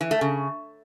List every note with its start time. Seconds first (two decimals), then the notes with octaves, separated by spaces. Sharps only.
0.01 E3
0.11 A3
0.21 C#3